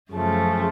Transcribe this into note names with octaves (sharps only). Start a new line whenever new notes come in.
F#2 C#3 F3 A3